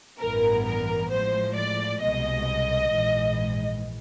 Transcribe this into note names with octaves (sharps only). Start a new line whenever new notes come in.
A1 G2 E3 G3 B3 A#4
A#4
A2 F3 G#3 C5
D5
C2 B2 G#3 D#5
A#1 G#2 E3